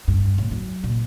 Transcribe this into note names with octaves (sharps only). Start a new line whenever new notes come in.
G2
A2
F#3
A#2